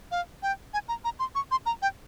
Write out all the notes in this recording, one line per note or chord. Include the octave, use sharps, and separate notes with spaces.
F5
G5
G#5
A#5
A#5
C6
C#6
C6
A#5
G5